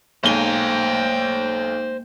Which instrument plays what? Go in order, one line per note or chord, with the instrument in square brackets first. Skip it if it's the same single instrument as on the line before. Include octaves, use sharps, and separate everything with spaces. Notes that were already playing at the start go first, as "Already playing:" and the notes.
[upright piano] B1 G7 [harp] G#2 A#3 [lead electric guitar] C5 G#5 [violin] G5